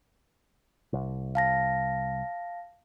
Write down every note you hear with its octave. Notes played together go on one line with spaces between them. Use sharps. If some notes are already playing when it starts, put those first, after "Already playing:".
C2
F5 A5 A#6